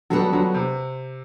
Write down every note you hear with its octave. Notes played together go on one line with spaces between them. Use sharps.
D3 F#3 G3 B3 F#4 A4
D3 F#3
C3